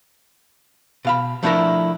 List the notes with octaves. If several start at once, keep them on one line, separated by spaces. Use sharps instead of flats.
B2 F5 B5
F3 A3 D4 E4 A4 A#4